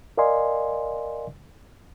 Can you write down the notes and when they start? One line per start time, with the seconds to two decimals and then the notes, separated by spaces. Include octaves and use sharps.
0.17 A#4 D5 D#5 F5 G#5 C6